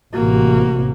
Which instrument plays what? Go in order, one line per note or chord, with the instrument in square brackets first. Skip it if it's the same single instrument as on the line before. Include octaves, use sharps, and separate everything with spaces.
[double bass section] A1 C3 [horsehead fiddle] A#3 F#4